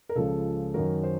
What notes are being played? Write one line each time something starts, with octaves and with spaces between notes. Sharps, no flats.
A#4
C#2 C#3 F3 G#3 A4
F#2 D#3 F#3 A#4
C5